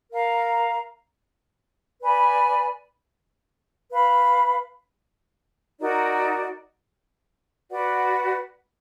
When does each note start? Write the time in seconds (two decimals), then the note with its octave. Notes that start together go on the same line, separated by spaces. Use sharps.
0.12 A#4 F5 A#5
2.02 B4 D5 G#5 B5
3.91 B4 F5 B5
5.80 D#4 F#4 A#4 D5
7.70 F#4 B4 D5 F#5